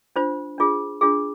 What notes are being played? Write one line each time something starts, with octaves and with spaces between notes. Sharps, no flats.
D4 F4 C5
D4 F4 G#4
D4 F4 G#4